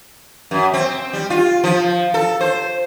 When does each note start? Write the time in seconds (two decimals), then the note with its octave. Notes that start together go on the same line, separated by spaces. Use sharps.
0.51 F#2
0.73 C4
1.13 G3
1.30 F4
1.64 F3
2.14 A4
2.41 C5